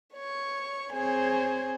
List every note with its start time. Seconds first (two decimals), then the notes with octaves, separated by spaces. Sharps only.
0.14 C#5 C#6
0.93 C4 G#4 C5 C#5 G#5